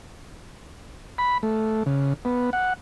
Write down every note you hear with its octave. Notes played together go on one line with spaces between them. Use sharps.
B5
A3
C#3
B3
F#5